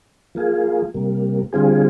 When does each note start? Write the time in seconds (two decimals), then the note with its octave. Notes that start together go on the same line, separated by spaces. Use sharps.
0.35 F3 A#3 F4 G#4
0.94 C3 G3 A#3
1.53 D3 G3 C4 F4 G#4